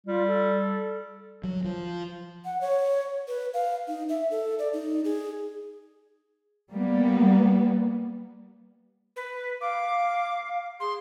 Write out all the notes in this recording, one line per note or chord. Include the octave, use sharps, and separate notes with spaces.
G3 F4
A4
F#3
F3
F#5
C#5
B4
F5
D#4
E5
A4
D5
D#4
G#4
G3 A#3 B3
B4
F5 D6
G#4 C6